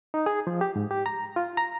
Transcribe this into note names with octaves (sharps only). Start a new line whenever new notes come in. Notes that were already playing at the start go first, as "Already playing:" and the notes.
D#4
G#4
F3
G4
G#2
G4
A#5
F4
A#5